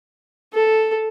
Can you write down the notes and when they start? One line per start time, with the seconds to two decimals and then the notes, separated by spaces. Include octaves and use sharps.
0.54 A4